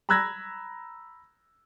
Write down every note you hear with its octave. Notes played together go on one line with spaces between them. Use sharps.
A#5 B5 E6 F#6 G#6 A#6